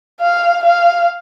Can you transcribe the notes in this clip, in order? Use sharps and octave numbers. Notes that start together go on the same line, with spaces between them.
F5
F5